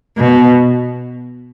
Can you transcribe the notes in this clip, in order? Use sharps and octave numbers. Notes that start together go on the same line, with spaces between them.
B2